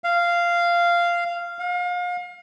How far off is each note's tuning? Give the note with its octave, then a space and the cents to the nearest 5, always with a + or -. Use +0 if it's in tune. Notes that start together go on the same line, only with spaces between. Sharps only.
F5 -10
F5 +35